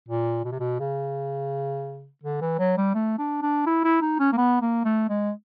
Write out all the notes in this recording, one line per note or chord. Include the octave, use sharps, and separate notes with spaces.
A#2
B2
C3
B2
C#3
D3
E3
F#3
G3
A3
D4
D4
E4
E4
D#4
C#4
A#3
B3
A#3
A3
G#3